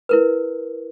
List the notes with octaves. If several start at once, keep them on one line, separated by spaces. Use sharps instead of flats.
E4 A#4 B4